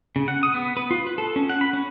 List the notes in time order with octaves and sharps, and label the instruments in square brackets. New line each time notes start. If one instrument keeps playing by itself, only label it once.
[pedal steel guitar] C#3
F#5
D#6
B3
B4
F4
B4
A4
C#4
F#5
B5
C#4